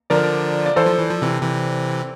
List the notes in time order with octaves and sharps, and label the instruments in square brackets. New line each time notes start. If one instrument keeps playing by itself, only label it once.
[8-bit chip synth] D3 F3 [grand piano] A#4 D5
[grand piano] D5
[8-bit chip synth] E3 [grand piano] A4 C5
[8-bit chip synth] F3
E3
F3
C3 E3
C3 E3